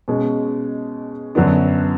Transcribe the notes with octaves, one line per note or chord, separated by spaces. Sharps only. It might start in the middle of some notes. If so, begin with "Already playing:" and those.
B2 G#3 C#4
F#2 D3 F#3 B3 D4